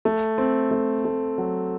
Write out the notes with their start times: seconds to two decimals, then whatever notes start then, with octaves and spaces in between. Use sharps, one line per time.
0.05 A3
0.38 C4
0.71 A3
1.05 A3
1.38 F#3